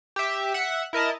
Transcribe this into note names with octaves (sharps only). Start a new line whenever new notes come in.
G4 E5
E5 F#5
E4 A#4 D#5 A5